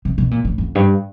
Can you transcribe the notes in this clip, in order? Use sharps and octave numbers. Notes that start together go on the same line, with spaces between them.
C3
B2
A#2
A2
F2
G2